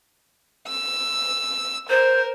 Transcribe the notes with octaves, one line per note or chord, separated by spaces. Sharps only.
E6
A#4 C5